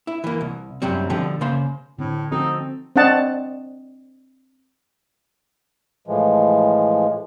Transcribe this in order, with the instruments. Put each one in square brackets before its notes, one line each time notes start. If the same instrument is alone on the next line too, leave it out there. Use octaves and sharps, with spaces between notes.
[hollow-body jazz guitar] E4
E3 A#3
C2
F#2 C3 F#3 G3 C4
B2 D3 F3 G4
C#3 A#3 C5 C6
[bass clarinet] A2 [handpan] D3 C4
[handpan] F3 F#4 A4 [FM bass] C4 [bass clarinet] D#4
[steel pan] C4 D4 D#5 F#5 A5
[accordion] A2 E3 F3 G#3